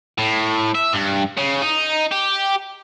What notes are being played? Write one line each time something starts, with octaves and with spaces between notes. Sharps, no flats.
A2
E5
G2
C#3
D#4
G4